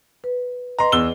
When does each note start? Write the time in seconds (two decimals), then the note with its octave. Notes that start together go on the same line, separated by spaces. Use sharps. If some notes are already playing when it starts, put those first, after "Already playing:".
0.24 B4
0.79 B4 D#5 A#5 C6
0.92 E2 G#4 E6 G7